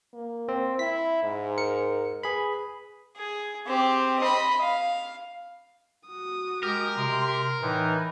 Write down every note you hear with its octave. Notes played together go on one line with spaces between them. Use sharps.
A#3
C4
E4 B6
G#2
A#4 C#7
G#4 B4 B5
G#4
C4 G4
D#5 B5
F5
F#4 D#6
G#3 G4 A#4
C3 C6
A2 E3 D#4 B4